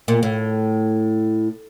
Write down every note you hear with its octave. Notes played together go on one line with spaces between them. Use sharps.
A#2
A2